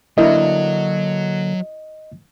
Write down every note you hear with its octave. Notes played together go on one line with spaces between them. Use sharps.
D3 F#3 A#3 D4 E4 A#4 D#5